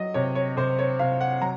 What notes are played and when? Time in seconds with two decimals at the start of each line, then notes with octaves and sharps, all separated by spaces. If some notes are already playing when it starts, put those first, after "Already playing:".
Already playing: F#3 D#5
0.14 C3 C#5
0.35 C#5
0.57 C3 C5
0.79 C#5
0.99 C3 F5
1.21 F#5
1.41 F#3 A#5